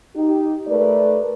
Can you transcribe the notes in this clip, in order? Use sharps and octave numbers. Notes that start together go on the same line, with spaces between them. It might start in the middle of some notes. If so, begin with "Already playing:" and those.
D#4 G4
A3 A#4 B4 D5